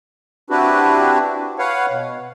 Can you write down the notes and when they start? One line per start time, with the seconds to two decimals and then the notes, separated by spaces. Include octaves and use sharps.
0.50 C4 D4 E4 F#4 G4 B4
1.59 B4 C#5 F5 F#5
1.91 B2